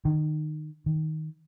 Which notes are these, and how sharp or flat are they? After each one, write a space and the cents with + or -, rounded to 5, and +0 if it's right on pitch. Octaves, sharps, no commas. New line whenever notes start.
D#3 -25
D#3 +10